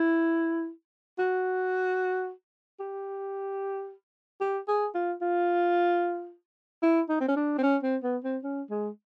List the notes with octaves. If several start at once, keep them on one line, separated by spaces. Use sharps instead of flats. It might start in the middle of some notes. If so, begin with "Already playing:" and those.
Already playing: E4
F#4
G4
G4
G#4
F4
F4
E4
D#4
C4
C#4
D4
C4
C#4
C4
B3
C4
C#4
G#3